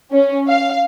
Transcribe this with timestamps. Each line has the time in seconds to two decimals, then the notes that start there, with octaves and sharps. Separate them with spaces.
0.12 C#4
0.48 F5